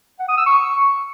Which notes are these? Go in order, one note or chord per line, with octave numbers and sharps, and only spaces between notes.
F#5
D#6
E6
C#6